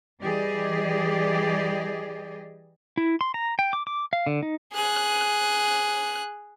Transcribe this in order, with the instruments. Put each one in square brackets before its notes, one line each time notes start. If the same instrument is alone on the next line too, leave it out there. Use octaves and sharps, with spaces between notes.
[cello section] E3 G3 G4 G#4 D5 D#5
[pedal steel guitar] E4
C6
A#5
G5
D6
D6
F5
D3
D#4
[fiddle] G#4 F#6